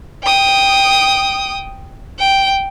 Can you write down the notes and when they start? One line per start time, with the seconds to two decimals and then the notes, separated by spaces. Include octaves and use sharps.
0.24 G5 D#6
2.19 G5